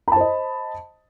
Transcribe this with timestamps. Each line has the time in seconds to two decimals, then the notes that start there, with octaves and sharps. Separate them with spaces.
0.08 B5
0.12 A5
0.16 C5
0.20 D#5